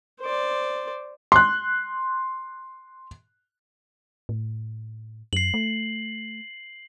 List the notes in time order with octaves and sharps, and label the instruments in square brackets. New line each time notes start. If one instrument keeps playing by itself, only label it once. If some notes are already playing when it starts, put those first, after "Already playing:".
[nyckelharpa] C5 D5
[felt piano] C6 F#6
[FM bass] A2
[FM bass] F#2 [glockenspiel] C7 F#7
[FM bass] A3